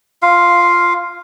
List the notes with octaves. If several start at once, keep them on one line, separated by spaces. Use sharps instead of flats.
F4 F5